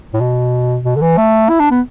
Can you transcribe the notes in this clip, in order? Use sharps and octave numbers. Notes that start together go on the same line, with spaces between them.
A2
B2
B2
D3
E3
A3
E4
D4
B3